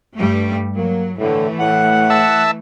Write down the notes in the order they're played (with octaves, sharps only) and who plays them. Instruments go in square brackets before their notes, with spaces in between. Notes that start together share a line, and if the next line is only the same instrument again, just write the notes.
[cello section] G2 G3 A3
[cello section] F#3 [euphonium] A#3
[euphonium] A2 [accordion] D3 [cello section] E3 A3
[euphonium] A2 [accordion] F#5
[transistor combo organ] E5 A5